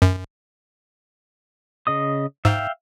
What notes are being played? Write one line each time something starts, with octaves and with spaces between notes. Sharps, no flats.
F#2
C#3 D#5 D#6
G#2 E5 F5 G5